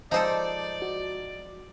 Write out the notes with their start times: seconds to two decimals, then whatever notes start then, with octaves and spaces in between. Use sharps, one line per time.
0.12 F3 G#3 D#4 A4 C5 D5
0.82 F#4